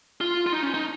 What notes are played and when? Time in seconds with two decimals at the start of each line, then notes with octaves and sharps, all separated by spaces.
0.21 F4
0.46 F4
0.53 D#4
0.63 C#4
0.74 D#4